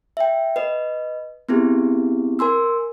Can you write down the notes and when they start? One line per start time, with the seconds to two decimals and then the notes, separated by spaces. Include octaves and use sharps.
0.17 E5 G5
0.56 B4 D#5
1.49 B3 C4 E4 G4 G#4
2.39 A#4 G#5 C6 E6